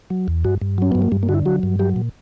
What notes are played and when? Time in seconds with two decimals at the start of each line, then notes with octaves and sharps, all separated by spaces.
0.10 F#3
0.28 E2
0.45 G2 F#4
0.61 G2
0.78 F#3 C#4
0.92 G2 B3
1.02 A#3
1.12 G2 G3
1.23 A#3
1.29 D3 F#4
1.34 E4
1.46 F#3 F#4
1.63 G2
1.79 F#3 G4
1.96 A#2